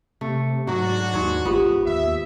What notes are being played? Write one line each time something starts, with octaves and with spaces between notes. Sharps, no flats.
C3 A3
G#2 F#3 D4 F#4
D#2 G#2 C#5
A1 B3 F4 G4
D#2 E5